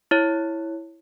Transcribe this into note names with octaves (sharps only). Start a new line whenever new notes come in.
E4 C#5